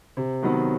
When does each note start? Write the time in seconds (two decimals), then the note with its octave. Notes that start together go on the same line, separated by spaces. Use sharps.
0.17 C3
0.43 D#3 F#3 B3